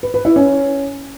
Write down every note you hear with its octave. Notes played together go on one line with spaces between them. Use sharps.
B4
B4
E4
C#4